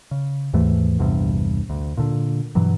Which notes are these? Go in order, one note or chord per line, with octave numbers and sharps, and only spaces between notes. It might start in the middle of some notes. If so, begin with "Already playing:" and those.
C#3
D#2 G#2 E3 A3
A#1 E2 G2 C3
D2
A#2 D3
G2 B2 E3 F#3